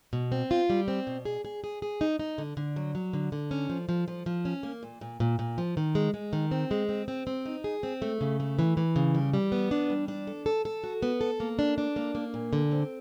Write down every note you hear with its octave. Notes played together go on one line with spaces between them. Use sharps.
B2
C4
F4
G3
C4
B2
G#4
G#4
G#4
G#4
D#4
D#4
D3
D3
F#3
F#3
D3
D3
C#4
F3
F3
F3
F3
C#4
A#3
A#2
A#2
A#2
A#2
F3
D#3
G#3
G#3
D#3
C4
G#3
C4
C4
C4
D#4
G#4
C4
A3
C#3
A3
E3
E3
C#3
G3
G3
B3
D4
G3
D4
A4
A4
A4
F#4
B3
A4
A#3
D4
D4
A#3
A#3
A#2
D3
C4